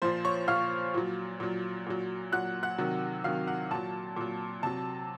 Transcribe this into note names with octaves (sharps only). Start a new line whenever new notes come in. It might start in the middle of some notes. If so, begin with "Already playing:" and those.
A#2 F3 C5 C6
C#5 C#6
A#2 F3 F5 F6
A#2 F#3
A#2 F#3
A#2 F#3
A#2 F#3 F#5 F#6
F#5 F#6
C3 D#3 F#3
C3 D#3 F#3 F5 F6
F#5
A#2 F#3 A5
A#2 F#3
C3 F#3 A5